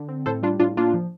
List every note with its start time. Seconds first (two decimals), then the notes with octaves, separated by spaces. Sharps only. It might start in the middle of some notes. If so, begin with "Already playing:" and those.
Already playing: D3
0.09 C4
0.26 A2 A4 C5
0.43 G3 D4 F4
0.60 A2 D4 F4
0.77 A#3 D4 F4
0.94 F3